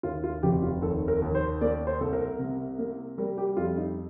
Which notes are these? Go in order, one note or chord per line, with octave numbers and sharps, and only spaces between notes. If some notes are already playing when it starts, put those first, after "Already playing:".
D#2 F4
F4
F1 G4
F4
D#2 A4
A#4
D#2
C5
A#3 D5
C5
C2 A4
A#4
C3
A#3
G3 A#4
G4
F2 F4
D#4